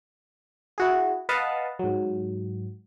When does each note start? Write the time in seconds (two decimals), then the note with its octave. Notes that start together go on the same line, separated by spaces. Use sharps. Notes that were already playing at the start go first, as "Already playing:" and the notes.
0.78 E4 F#4 G#4
1.29 B4 D#5 F5 F#5 A5
1.79 G#2 F#3